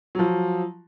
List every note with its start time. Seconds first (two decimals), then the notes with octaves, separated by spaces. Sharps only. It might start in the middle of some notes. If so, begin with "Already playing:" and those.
0.15 F3 F#3